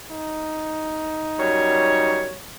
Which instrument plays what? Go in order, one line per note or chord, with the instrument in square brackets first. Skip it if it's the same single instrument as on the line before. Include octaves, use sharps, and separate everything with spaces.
[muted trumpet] D#4
[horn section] F#2 G3 C#5